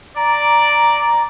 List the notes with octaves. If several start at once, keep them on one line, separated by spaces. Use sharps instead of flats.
D5 A#5